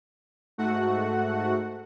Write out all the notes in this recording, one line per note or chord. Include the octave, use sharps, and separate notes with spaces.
G#2 A3 F#4 F#5